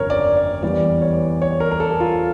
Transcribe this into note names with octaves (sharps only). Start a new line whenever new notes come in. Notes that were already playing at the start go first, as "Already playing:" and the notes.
Already playing: G1 F2 C#3 A#4 C#5
D5
D5
E2 E3 G3 D5
C#5
C#5
A#4
A#4
A4
F4